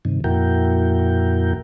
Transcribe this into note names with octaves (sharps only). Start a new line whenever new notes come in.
G2 C3 D#3
F2 A#2 E4 F#4 A#4 G5